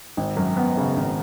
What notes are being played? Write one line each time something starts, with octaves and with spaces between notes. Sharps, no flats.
G#1
F#2
B3
C#3
G#1